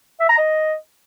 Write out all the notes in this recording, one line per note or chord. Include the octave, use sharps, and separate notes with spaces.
E5
A#5
D#5